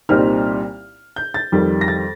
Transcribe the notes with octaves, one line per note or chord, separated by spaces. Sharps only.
C2 A#2 G3 C4 D#4 F6
G6
A6
F2 D#3 G3
A#6
A6